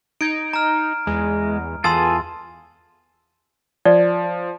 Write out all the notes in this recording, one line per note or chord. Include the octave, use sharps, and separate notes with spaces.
D#4 G#6 D7
A#5 F6
E2 G#3
E2 F4 G#4 A4 C6 E6 A6
F3 D5